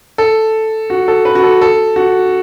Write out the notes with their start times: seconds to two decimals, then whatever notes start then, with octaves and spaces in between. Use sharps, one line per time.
0.18 A4
0.90 F#4
1.08 A4
1.25 B4
1.35 F#4
1.43 A4
1.61 A4
1.96 F#4